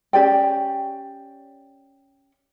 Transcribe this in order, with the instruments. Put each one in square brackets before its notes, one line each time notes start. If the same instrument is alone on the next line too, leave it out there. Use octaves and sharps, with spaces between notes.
[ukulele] C#4 G4 D5 G5